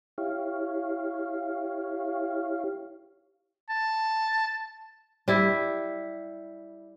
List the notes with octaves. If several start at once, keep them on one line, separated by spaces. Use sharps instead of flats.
E4 G4 C#5 F5
A5
G3 E4